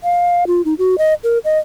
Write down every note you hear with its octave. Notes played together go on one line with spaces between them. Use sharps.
F5
F4
D#4
F#4
D#5
A#4
D#5